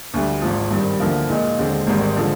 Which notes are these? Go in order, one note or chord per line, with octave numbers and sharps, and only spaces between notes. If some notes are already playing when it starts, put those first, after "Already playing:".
D2 D3 G3
G#1 G#2 F3
G2 D#3 G3 C4
D2 D3 F3 A#3
A#2 G#3 D#4
D#2 D3 G#3 C4
G#1 G#2 D#3 G3 C4
D3 F3 G#3